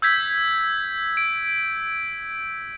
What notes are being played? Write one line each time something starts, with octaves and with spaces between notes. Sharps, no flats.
E6 G6 G#6 B6
D7